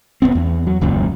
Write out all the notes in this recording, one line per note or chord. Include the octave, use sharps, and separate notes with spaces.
D#1 E2 B3 C4
E2
F#3
D#1 C#2 F#2 A#2